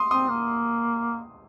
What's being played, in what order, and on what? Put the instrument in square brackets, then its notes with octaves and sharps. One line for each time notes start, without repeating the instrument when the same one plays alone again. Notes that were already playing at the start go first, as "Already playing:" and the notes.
Already playing: [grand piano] C6 D#6
[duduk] C4 [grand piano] C6 D#6
[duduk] A#3